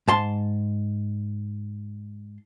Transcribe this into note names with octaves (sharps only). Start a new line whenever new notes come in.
G#2 A5 C6